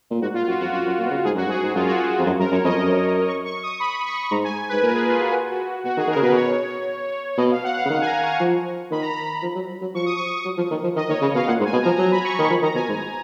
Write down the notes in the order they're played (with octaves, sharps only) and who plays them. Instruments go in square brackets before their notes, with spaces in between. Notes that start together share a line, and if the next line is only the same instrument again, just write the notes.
[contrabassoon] A#2
[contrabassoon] G#2 [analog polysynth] F#4
[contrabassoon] A#2 [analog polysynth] F4
[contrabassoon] F#2 [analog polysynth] F#4
[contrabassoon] F2 [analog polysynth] F#4
[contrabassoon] F#2 [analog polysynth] F#4
[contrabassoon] F#2
A#2
B2
C#3
[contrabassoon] G#2 [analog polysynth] G#4
[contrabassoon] F#2 [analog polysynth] F#4
[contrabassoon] G#2 [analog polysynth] G#4
[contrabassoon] G#2 [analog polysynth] F#4
[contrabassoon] F#2 [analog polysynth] F4
[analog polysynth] F#4
F4
[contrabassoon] F2
F#2
[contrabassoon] F#2 [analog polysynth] A#4
[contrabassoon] F#2 [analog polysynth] C#5
[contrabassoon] F2 [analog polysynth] D#5
[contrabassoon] F#2 [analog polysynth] D#5
[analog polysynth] C#6
C#6
D#6
B5
D#6
C#6
C#6
[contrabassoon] G#2 [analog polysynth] A#5
[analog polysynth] G#5
B4
[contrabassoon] G#2
[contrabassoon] A#2 [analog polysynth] A#4
[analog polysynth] G#4
F4
F#4
G#4
F#4
[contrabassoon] B2 [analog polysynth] F#4
[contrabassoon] D#3 [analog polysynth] G#4
[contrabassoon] D#3
[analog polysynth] A#4
[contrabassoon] C#3
[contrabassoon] B2 [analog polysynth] B4
[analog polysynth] C#5
[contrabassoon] B2 [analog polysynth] D#5
[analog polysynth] F5
F#5
F5
[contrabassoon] C#3
[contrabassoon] D#3 [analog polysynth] F#5
[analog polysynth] G#5
A#5
C#6
[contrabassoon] F3
[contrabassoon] D#3 [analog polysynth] B5
[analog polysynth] A#5
B5
[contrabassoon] F3
F#3
F#3
[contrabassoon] F3 [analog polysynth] C#6
[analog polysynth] D#6
C#6
[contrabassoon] F#3
F3
D#3
F3
[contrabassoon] D#3 [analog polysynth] D#5
[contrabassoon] D#3 [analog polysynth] C#5
[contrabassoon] C#3 [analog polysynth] D#5
[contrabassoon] B2 [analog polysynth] F5
[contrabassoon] A#2 [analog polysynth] F#5
[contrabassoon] G#2
[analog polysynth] G#5
[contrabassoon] B2
[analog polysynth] A#5
[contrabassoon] F3
[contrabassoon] F#3 [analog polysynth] A#5
[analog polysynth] B5
C#6
[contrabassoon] D#3 [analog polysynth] C#6
[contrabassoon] F3 [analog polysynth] B5
[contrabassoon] D#3 [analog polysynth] A#5
[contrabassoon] B2 [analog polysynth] G#5
[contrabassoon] G#2 [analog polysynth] G#5